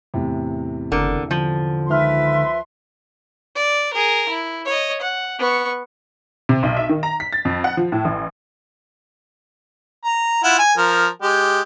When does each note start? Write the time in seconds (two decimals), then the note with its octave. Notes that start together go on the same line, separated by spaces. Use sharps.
0.14 E2 A2 C3
0.92 F#1 D3 A#4
1.31 D3 F3
1.88 C#2 D#3 B4 E5 C6 F6
3.55 D5
3.94 G#4 A#4
4.29 E4
4.65 C#5 D#5
5.01 F#5
5.39 B3 C#6
6.49 C3
6.63 B1
6.76 E5
6.89 D#3
7.03 A#5
7.20 B6
7.33 A6
7.45 F2
7.64 F#5
7.77 F3
7.92 A2
8.05 A1
10.05 A#5
10.44 E4 F4 F#5
10.59 G#5
10.77 F3 A#4
11.22 G#3 G4